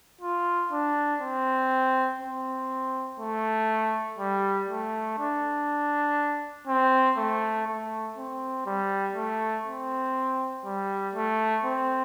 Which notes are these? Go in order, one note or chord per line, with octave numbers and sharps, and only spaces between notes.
F4
D4
C4
C4
A3
G3
A3
D4
C4
A3
A3
C4
G3
A3
C4
G3
A3
C4